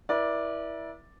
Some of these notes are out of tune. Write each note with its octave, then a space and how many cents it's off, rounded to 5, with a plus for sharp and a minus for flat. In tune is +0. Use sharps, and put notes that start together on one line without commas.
E4 +0 B4 -45 D5 +0